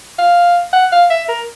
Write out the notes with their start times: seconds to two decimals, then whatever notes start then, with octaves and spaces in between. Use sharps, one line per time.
0.19 F5
0.73 F#5
0.92 F5
1.10 E5
1.29 A#4